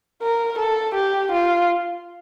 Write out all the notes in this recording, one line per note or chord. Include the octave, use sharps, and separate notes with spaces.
A#4
A4
G4
F4